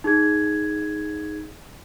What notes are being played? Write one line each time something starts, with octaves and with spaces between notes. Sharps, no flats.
D#4 G#4 G#6